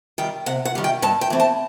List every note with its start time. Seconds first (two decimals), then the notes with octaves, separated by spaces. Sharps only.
0.18 D#3 G3 G5
0.46 C3 F#5
0.65 F#5
0.75 D#3 G3
0.84 G5
1.02 G2 A5
1.21 G5
1.30 E3 A3 C4
1.40 A5